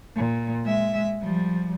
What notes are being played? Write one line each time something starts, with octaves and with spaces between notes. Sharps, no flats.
A#2
G#3 E5
F3 G3